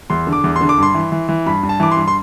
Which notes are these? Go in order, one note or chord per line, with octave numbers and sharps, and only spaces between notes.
E2 C6
D3
D6
E2
D3 C6
D6
G2 C6
E3
E3
E3
G2 B5
G2
A5
E3 D6
C6
G2
C6